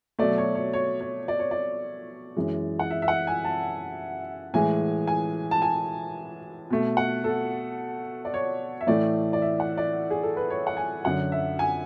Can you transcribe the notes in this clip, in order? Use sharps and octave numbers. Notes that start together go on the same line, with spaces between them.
B2 F#3 A3 D5
C#5
C#5
C#5
C#5
D5
C#5
D5
F#2 E3 G#3
F#5
E5
E5
F#5
G#5
A5
A2 E3 G#3 G#5
G#5
A5
G#5
B2 A3
F#5
A4
D5
C#5
E5
A2 E3 A3 D5
D5
E5
F#5
D5
G#4
A4
B4
C#5
F#5
G#5
F#2 D3 F#3 F#5
E5
G#5